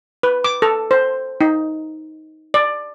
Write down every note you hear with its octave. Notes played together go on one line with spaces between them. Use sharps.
B4
D6
A4
C5
D#4
D5